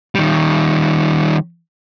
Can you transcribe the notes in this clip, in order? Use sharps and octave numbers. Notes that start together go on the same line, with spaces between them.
D#3 G3